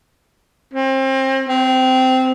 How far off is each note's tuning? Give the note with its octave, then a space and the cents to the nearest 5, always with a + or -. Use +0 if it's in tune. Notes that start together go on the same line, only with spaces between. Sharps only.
C4 +30
C4 -15